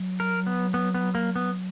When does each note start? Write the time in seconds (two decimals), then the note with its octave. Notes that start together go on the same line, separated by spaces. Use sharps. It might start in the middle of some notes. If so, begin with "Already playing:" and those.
Already playing: F#3
0.20 A#4
0.47 B3
0.74 B3
0.95 B3
1.15 A#3
1.36 B3